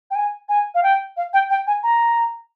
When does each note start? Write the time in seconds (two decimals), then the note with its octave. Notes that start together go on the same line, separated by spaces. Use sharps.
0.11 G5
0.15 G#5
0.49 G#5
0.75 F5
0.83 G5
1.17 F5
1.34 G5
1.50 G5
1.67 G#5
1.83 A#5